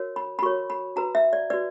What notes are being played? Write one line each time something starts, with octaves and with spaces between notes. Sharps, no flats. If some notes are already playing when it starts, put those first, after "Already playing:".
Already playing: F#4 A#4 C#5
B5
B5
F#4 A#4 C#5 C#6
B5
F#4 B4 A#5
E5
D5
F#4 B4 D5